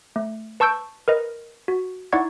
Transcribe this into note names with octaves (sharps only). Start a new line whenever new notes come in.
A3
B4 A5 C#6 E6 G6 D7
A#4 B4 D#5
F#4
D#4 E4 D5 F#5 C#6 G#6